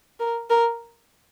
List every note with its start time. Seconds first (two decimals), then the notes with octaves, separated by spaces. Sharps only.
0.20 A#4
0.50 A#4